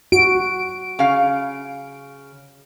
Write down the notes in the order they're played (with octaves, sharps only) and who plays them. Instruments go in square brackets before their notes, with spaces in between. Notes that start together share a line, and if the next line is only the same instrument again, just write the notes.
[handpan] F#4 [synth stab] D7
[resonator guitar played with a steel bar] C#3 F5